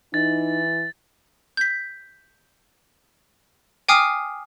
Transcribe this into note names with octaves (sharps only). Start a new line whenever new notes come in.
E3 D#4 A6
G6 B6
G5 G#5 D6 D#6 F6 C7